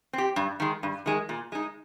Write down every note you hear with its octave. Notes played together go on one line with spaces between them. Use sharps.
C4 G4
G2
D#3 G#3
G2
D#3 G#3
A#2
G#3 D#4